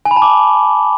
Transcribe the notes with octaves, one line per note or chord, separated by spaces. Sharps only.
G#5
B5
A5
D6